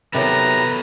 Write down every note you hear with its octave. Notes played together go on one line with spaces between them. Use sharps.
C3 D#3 F#3 B3 A4 B4 C#5 A#5